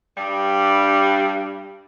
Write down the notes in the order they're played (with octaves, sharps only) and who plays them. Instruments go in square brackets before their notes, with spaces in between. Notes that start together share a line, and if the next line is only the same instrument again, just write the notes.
[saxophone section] G2 G3